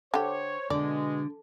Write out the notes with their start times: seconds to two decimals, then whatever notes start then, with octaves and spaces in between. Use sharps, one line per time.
0.14 D3 G4 C5 C#5
0.70 B2 D3 G#3 D5